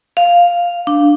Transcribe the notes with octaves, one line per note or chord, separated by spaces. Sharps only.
F5
D4